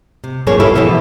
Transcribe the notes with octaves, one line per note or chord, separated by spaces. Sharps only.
C3
G2 B2 F3 A#3 G#4 C#5
E4 F4 G4 A4 B4
B2 E3 F3 B3 E5